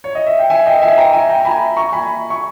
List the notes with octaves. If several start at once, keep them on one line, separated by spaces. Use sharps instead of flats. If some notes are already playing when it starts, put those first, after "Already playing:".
C#5
D#5
E5
G5
E5 G#5
D#5 G5
E5 G#5
G5 A#5
E5 G#5
G5 A#5
A#5
G#5 B5
A#5 C#6
G#5 B5
C#6